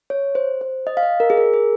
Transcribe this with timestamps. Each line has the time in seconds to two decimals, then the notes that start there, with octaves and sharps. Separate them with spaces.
0.10 C#5
0.35 C5
0.61 C5
0.87 D#5
0.97 F5
1.03 D#5
1.20 A#4
1.30 G#4
1.37 A#4
1.53 G#4